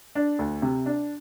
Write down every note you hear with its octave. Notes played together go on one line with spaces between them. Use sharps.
D4
D2
C3
D4